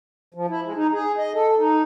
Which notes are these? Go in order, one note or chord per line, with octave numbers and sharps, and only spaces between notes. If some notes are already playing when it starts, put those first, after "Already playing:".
F3
E4
G#3
D#4
G#4
D#5
A4
D#4